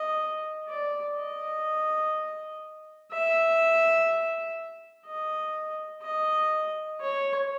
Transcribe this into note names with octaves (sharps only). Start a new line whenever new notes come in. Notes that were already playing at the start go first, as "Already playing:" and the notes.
Already playing: D#5
D5
D#5
E5
D#5
D#5
C#5